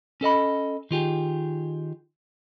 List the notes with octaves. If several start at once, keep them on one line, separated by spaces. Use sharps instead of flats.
C#4 A4 D#5 B5
D#3 F4 G4 G#4